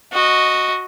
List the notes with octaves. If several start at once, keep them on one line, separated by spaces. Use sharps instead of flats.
F#4 D#5